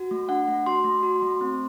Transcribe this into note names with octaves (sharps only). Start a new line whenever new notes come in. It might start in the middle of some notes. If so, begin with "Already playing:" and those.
Already playing: F#4
A3
D4 F#5
A3
F#4 C6
A3
F#4
A3
C4